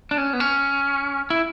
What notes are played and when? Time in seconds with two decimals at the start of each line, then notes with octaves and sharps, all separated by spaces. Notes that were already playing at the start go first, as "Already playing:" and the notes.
0.11 D4
0.18 C#4
0.33 B3
0.40 C#4
1.30 E4